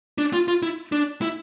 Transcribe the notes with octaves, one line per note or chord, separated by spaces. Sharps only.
D4
F4
F4
E4
D4
E4